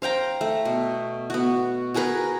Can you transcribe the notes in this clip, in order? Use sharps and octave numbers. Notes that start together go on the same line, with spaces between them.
C5 F5 G5 A#5
A3
B2
B3 F#4
F#4 G#4 A#4 B4